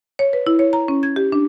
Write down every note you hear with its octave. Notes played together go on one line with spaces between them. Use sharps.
C#5
B4
E4
C#5
A#5
C#4
G#6
G4
D4